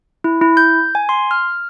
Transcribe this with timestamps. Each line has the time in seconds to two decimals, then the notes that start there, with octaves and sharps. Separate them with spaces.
0.24 E4
0.41 E4
0.57 G6
0.95 G#5
1.09 C6
1.31 F6